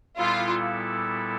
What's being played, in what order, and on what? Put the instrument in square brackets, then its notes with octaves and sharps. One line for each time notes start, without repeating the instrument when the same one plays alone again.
[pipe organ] A#2 G3 B3 E4 A4 [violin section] F4